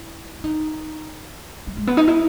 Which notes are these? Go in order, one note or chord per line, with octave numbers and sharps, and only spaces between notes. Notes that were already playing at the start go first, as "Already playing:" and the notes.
Already playing: E4
D#4
F#3
G#3
B3
D#4
E4